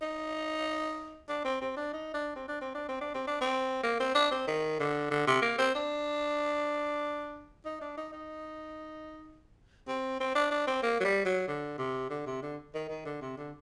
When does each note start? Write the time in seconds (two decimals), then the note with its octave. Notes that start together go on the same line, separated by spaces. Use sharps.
0.02 D#4
1.29 D4
1.44 C4
1.61 C4
1.77 D4
1.93 D#4
2.14 D4
2.36 C4
2.48 D4
2.61 C4
2.74 D4
2.88 C4
3.01 D4
3.14 C4
3.27 D4
3.41 C4
3.83 A#3
4.00 C4
4.15 D4
4.31 C4
4.47 D#3
4.79 D3
5.11 D3
5.27 C3
5.42 A#3
5.58 C4
5.75 D4
7.65 D#4
7.81 D4
7.97 D#4
8.13 D#4
9.88 C4
10.20 C4
10.35 D4
10.51 D4
10.67 C4
10.83 A#3
11.00 F#3
11.04 G3
11.25 F#3
11.47 D3
11.78 C3
12.10 D3
12.26 C3
12.42 D3
12.75 D#3
12.89 D#3
13.05 D3
13.21 C3
13.37 D3